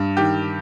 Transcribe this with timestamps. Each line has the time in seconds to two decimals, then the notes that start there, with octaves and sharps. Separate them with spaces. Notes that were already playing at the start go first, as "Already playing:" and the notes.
Already playing: G2
0.17 D#3 G4